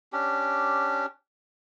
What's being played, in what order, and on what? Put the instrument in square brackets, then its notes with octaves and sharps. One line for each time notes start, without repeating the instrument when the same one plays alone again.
[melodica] C#4 D4 G4